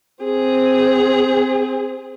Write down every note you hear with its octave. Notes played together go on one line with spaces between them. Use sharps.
C4 G#4